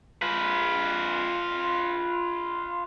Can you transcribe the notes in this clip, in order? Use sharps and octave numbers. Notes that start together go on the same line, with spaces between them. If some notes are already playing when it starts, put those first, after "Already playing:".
F4 B4